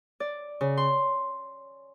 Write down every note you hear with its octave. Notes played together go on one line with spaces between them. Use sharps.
D5
C#3
C6